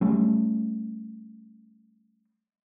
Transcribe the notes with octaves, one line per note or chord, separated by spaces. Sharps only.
G3 A3 C#4